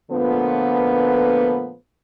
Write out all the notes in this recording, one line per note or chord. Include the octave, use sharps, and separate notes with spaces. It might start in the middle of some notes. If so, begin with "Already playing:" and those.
A#2 D3 F3 A3 B3